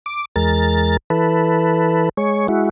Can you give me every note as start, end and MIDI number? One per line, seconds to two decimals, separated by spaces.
0.06 0.25 86
0.36 0.97 40
0.36 0.97 56
0.36 0.97 70
0.36 0.97 93
1.10 2.09 52
1.10 2.09 69
1.10 2.09 71
2.17 2.47 56
2.17 2.47 73
2.48 2.69 56
2.48 2.69 64
2.48 2.69 66